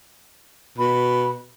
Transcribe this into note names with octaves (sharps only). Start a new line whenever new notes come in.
B2 B5